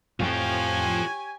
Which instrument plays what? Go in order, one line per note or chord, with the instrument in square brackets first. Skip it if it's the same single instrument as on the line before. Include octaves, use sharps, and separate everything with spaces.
[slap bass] F2 A2 [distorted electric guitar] F3 [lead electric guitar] F4 G5 [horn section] G4 C#5 G#5